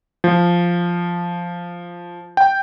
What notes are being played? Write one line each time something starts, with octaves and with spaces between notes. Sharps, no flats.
F3
G5